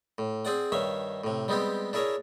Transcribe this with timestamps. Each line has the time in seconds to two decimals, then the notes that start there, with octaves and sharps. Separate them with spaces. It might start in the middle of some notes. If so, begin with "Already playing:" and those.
0.18 A2
0.45 C4 G#4 D5 F#5
0.72 G2 D#3 C#5 E5 F5
1.24 A2 C3
1.48 G3 G#3 B3 C4 G4
1.93 D4 E4 G#4 A#4 C#5